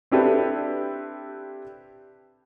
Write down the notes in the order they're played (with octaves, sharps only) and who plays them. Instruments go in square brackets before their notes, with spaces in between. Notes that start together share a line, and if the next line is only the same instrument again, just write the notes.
[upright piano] C4 D4 E4 G4 A4 B4